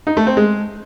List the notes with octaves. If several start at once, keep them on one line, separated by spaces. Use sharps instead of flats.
D#4
A3
C4
G#3